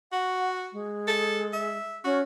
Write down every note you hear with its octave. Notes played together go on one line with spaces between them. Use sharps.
F#4 F#5
G#3
A4
E5
C#4 F#4